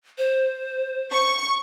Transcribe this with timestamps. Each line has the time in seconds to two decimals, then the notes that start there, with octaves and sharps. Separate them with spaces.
0.18 C5
1.11 C#6